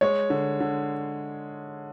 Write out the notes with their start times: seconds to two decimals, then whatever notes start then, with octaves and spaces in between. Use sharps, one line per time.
0.01 G#3 C#5
0.30 D3
0.60 D3